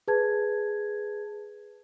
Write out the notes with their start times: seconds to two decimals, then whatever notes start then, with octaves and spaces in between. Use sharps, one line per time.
0.08 G#4 B4 A5 G#6